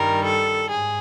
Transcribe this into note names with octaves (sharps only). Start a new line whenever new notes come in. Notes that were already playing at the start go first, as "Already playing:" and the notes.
Already playing: G2 D#3 G3 A#4
A4
G#2 G#4